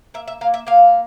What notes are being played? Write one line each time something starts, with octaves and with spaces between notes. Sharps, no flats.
A#3 E5
E5
A#3 F5
E5
A#3 F5